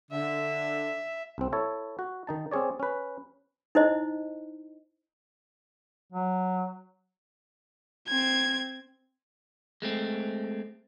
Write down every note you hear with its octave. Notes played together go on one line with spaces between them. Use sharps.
D3 E5
C2 C4
E4 A4 C#5
F#4
D#3 D#4 A5
C4 C#4 G#4 C#5 D5
C#4 B4
D#4 E4 C5 D#5
F#3
C4 G#6
G#3 A3 C4